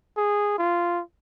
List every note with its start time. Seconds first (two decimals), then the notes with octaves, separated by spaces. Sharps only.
0.17 G#4
0.58 F4